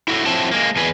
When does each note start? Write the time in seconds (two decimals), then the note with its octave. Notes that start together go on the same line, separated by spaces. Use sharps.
0.08 E4 F#4 G4 A4
0.26 F3 F#3 C4 E4 A5
0.51 G#3 A#3
0.76 E2 G#4 B4